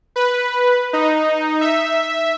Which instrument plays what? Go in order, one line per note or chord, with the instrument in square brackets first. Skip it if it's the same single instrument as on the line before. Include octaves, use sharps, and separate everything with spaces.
[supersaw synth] B4
D#4
E5